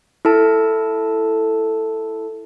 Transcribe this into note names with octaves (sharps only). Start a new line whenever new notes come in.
E4 A4 A5